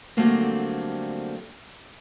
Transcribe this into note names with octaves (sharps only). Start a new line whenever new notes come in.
D3 F#3 G3 A3 A#3 C4